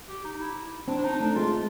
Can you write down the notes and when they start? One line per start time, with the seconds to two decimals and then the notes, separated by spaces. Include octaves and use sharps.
0.09 G4
0.25 D#4
0.41 E4
0.88 C4 D4
0.98 D4
1.04 D#4
1.20 A3 D4
1.36 G#3 F4